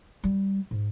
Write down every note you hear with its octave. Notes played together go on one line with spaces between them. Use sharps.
G3
G#2